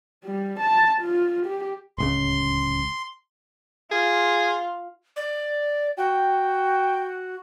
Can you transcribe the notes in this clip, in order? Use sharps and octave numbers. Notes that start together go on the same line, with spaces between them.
G3
A5
F4
G4
D1 C#2 C#3 C6
F4 G#4
D5
F#4 G5